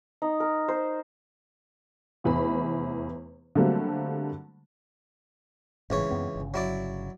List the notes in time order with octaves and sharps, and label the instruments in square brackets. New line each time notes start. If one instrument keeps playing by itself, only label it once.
[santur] D#4
A#4
C5
[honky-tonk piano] F1 E2 B5
D3 F#3 G3 A3 A#3 C4
[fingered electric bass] G1 A2 [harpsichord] C#2 E3 C#5
[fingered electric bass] F#2 B3 C4
G1 C#3
[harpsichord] F#3 E4 D5